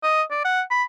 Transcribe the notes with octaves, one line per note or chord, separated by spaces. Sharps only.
D#5
D5
F#5
B5